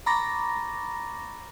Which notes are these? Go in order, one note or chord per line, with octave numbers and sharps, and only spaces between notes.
A#5 B5 C#6 D6 A6 A#6